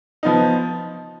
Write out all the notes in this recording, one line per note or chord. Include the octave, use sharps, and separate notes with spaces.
F3 B3 D#4